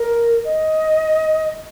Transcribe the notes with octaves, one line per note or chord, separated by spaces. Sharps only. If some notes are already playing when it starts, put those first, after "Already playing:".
Already playing: A#4
D#5